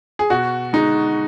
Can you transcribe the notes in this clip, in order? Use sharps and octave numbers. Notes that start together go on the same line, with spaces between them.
G#4
B2 F#4
G#3 D#4